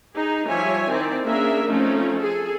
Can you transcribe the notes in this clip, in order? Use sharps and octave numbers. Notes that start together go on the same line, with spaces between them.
D#4 G#4
F3 G3 C#5 E5 G#5
D#3 C4 E4 D5
A#3 C#4 D4 G#4 A#4 E5
F3 A3 C4 C#4 D#4
G#4 A4